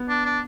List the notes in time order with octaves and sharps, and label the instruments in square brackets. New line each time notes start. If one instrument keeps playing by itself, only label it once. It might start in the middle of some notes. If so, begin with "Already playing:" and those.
Already playing: [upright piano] B3
[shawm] D4
D4